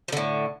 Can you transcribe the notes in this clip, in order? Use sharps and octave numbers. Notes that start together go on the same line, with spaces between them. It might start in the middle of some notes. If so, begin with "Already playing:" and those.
A2 D3 F3